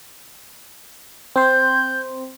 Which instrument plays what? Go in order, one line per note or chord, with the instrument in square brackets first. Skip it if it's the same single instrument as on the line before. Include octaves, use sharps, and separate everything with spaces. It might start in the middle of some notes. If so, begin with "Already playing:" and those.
[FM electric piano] C4 C5 [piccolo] G6